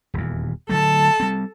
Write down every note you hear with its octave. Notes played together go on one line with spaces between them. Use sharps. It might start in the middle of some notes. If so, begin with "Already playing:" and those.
D#1 E2
D3 F#3 A3 A4 A5
G3 C4